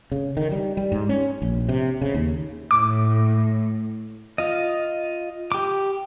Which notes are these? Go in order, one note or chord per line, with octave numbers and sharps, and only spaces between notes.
C#3
D#3
G3
G3
G#2
C#4
A#1
C3
C#3
D#2
A2 D6
F4 D#5
G4 D6